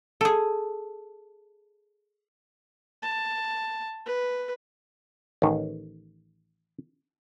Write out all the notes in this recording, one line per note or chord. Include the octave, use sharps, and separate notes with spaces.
G#4 A4
A5
B4
A1 D#3